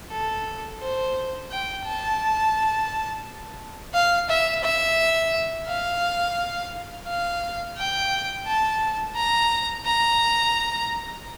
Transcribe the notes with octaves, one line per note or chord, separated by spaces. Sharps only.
A4
C5
G5
A5
F5
E5
E5
F5
F5
G5
A5
A#5
A#5